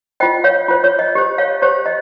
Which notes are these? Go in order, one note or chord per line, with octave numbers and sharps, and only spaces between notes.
F4 C5 D#5 G5
C#5 F5
F4 C5
C#5
D#5
G4 C5
C#5 F5
G4 C5 C#5
D#5